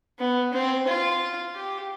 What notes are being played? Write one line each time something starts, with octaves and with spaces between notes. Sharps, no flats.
B3
C4
F4
G4